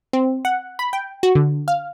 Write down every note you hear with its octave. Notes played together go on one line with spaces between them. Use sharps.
C4
F#5
B5
G5
F#4
D3
F5